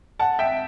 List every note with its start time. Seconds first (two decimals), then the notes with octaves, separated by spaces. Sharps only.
0.19 F#5 A5
0.39 E5 G5